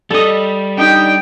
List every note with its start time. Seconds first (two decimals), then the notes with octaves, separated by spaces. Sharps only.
0.10 G3 A4 D#5
0.77 D4 D#4 G4 G5